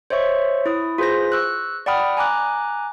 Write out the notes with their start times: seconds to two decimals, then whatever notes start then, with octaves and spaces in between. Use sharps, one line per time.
0.10 C5 C#5 D#5 E5 C#6
0.66 E4 D#6
0.98 F4 G#4 B4 C5 G6 A#6
1.32 C#6 E6 F#6
1.86 D5 F#5 G5 B5 D#6 F6
2.17 G#5 A#5 D6 F#6